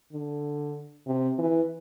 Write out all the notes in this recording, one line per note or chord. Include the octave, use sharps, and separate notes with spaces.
D3
C3
E3